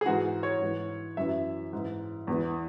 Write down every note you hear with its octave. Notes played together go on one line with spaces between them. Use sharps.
G#4
G#2 E3 F#4
C#5
G#2 E3
F#2 E3 E5
G#2 E3
E2 E3